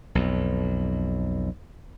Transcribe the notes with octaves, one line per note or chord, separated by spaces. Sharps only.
B1 F2